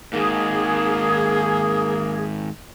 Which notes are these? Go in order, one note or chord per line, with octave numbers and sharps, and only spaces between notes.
G#2 D#3 A#3 G#4